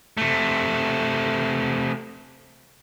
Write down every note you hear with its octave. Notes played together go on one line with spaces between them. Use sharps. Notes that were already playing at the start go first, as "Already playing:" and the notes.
C3 A3